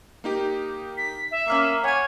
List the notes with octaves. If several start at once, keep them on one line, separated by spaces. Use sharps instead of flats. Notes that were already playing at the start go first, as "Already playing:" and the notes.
A#3 D#4 G4
B6
E5
A#3 C#4 F6 C7
C#5 F#5 G#5 G#6